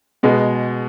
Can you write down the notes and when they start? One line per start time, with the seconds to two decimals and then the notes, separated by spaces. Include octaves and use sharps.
0.23 B2 G#3 B3